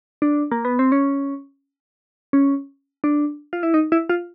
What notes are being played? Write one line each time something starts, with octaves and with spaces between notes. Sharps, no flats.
D4
A#3
B3
C4
C#4
C#4
D4
F4
E4
D#4
E4
F4